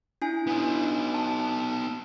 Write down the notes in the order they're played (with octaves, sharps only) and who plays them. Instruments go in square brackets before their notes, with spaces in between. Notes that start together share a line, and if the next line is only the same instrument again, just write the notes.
[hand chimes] D4 E4 G#5
[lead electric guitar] B3 D#4
[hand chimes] A5